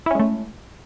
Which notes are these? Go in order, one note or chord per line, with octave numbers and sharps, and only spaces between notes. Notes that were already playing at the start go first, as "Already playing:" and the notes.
G#3 A3 C#4 E4